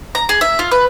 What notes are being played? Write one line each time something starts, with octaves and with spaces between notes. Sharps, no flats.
A#5
G#4
E5
F4
B4